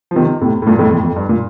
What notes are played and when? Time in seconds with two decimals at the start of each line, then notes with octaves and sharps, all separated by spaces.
0.11 F3
0.16 C3 D#3
0.41 A2 C3
0.62 A2
0.67 G2 A#2
0.79 F2 A2
0.91 F2 A2
1.04 F2
1.16 G2
1.29 A#2